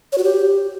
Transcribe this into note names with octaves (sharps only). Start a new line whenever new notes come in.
C#5
F#4
G4